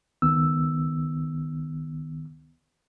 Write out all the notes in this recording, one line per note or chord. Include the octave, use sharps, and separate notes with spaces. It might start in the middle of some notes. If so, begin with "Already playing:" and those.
C#2 D#3 B3 E6